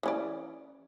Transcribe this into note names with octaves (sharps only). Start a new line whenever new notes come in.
E3 C#4 D5